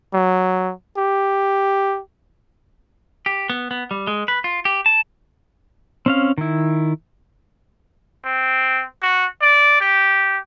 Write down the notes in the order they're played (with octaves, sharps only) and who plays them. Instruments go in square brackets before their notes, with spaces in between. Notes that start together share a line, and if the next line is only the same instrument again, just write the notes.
[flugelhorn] F#3
G4
[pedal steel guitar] G4
B3
B3
G3
G#3
B4
F4
G4
A5
C4 C#4 F5
D#3 E4
[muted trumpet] C4
F#4
D5
G4